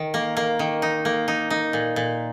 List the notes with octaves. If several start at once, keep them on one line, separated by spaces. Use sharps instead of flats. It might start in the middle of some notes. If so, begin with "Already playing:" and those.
Already playing: D#3
A#3
A#3
D#3
D#4
A#3
D#4
D#4
A#2
A#2